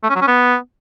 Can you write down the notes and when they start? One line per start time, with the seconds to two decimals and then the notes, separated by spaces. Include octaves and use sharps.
0.03 A3
0.09 C#4
0.15 F#3
0.21 C#4
0.27 B3